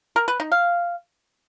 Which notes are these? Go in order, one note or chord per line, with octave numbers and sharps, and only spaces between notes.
A#4
B4
D#4
F5